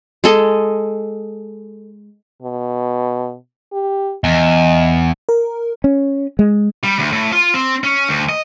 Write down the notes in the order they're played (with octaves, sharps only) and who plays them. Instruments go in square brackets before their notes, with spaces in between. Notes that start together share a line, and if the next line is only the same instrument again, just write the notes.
[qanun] G#3 A4 D#5
[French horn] B2
G4
[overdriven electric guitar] E2 [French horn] D#5
[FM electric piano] A#4
[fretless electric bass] C#4
G#3
[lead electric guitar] G3
D2
A2
F4
C4
C#4
D2
D#5